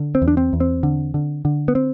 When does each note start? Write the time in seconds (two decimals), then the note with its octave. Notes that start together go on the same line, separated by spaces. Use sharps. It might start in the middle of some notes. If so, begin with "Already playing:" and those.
Already playing: D3
0.15 C4
0.22 E2
0.28 D4
0.37 C4
0.53 E2
0.60 C4
0.83 D3
1.14 D3
1.45 D3
1.68 B3
1.75 C4